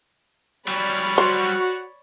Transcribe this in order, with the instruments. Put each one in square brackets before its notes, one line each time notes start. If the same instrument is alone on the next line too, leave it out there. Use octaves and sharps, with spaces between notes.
[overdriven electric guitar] F#3 G3 [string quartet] C#5 D5 B5
[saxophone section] F#4 [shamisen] C5